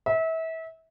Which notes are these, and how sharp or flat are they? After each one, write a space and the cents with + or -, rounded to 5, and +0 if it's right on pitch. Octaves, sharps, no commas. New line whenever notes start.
E5 -30